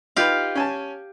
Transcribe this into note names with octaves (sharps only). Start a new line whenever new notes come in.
D#4 F4 G4 B4 F5
C#4 G#5 A5